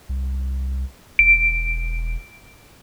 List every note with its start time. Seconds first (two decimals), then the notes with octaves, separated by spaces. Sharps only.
0.09 C2
1.19 E1 D7